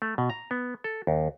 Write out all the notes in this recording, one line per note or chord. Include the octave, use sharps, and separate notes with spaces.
A3
B2
A#5
B3
A4
D#2